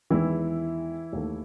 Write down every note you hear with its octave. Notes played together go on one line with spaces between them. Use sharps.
E2 D#3 E3 G#3 E4
D#2 D#3 A3